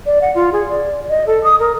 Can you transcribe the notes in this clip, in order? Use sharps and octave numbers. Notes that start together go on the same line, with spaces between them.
D5
F#5
F4
G#4
D5
D#5
A4
D#6
A#4